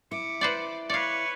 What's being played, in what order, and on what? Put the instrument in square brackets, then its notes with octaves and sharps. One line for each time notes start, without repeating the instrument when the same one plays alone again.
[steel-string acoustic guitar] E4 [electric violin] D6 [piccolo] C#7
[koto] B4 C5 D5
[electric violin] B4 C#5 [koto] D5 F5 [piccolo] C#7